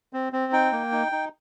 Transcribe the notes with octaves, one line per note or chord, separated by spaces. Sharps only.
C4
C4
D#4 G5
A#3
D#4
D#4